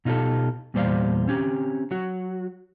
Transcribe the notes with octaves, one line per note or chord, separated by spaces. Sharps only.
B2 D#4 F4 G4 A4
E2 A#2 G3 C5 D5 F5
C4 C#4 G4
F#3 F#4